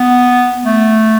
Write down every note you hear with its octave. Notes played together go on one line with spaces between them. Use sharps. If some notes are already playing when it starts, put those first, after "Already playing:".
Already playing: B3
A3